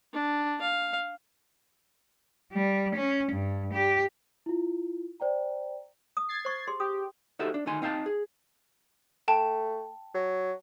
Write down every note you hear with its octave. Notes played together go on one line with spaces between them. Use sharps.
D4
F5
G3
C#4
G2
G4
E4 F4
C5 D5 G5 A#5
D#6
G#6 A6 C7
C5 C#6
G4 G#4 C6
G4 D#6
D#4 F#4 G4 A4 C5 E5
D4
D2 D#3 D#4 G#5 C6
C4 D#4 F5 G5 A5
G#4
A3 G5 A5
F#3